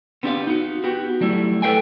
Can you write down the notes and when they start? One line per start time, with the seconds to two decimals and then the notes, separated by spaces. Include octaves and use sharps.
0.23 B3 C4 D4 F4 G4 F5
0.47 D#4 F#4
0.84 B3 F#4 G4
1.21 F#3 G3 A3 E4
1.62 A4 B4 C5 F5 G5 G#5